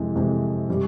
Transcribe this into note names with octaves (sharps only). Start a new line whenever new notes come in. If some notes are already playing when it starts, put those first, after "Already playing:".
Already playing: F2 C3 E3 G#3
F2 C3 E3 G#3
C3 G3